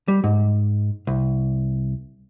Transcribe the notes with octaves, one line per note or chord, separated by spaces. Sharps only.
G3
G#2
C2